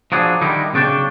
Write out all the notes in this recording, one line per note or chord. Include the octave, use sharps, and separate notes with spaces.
F3 F#3 D4 G#4
D3 D#3 G3 D#4 E4
B1 C#3 D4 C#5 G5 A5